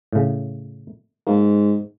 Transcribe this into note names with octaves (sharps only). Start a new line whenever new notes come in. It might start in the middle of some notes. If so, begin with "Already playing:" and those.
A2 C#3
G#2 A#3